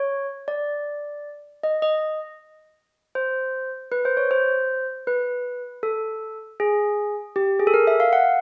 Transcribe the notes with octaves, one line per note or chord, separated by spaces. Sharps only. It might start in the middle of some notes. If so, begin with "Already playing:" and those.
Already playing: C#5
D5
D#5
D#5
C5
B4
C5
C#5
C5
B4
A4
G#4
G4
G#4
A4
A#4
E5
F5
F#5